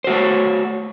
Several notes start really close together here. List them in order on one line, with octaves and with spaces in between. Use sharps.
C5 F#4 A3 C#5